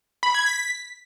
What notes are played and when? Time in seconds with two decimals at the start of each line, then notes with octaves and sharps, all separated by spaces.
0.23 B5
0.35 G#6
0.46 B6